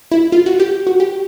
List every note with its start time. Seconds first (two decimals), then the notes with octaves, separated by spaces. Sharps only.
0.11 E4
0.32 F4
0.46 F#4
0.60 G4
0.87 F#4
1.00 G4